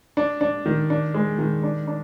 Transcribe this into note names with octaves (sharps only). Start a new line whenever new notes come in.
D4
D4
D#3
D4
G#3
D#3
D4
D4